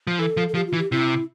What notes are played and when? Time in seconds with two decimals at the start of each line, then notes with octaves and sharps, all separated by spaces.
0.07 F3
0.19 E3 A4
0.37 F3
0.49 A4
0.55 F3 G4
0.67 F4
0.73 E3
0.79 G4
0.91 C3 E4